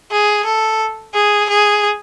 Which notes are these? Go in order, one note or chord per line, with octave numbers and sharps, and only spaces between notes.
G#4
A4
G#4
G#4